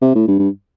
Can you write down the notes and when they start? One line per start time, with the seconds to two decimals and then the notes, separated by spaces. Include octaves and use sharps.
0.02 C3
0.15 A2
0.28 G2
0.39 G2